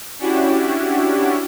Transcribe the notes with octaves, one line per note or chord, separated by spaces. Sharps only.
C#4 D4 E4 F#4 G4